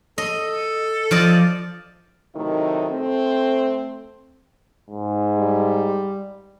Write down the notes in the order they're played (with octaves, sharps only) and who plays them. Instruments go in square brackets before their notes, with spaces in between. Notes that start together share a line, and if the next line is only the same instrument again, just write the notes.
[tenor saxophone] A4 [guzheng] D#5
[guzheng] F3 D5 D#5
[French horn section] C3 D#3 F#3 A3 D#4 E4
A3 C4
[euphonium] G#2
[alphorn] G3